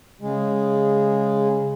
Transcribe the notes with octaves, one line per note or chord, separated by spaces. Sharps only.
C#3 G#3